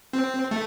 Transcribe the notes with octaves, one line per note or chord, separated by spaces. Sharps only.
C4
A3